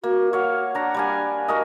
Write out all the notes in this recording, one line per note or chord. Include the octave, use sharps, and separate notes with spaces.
A#3 F#4
C#5 F5 F#5
D4 A#5
G3 D4 G#5
F#4 A#4 D#5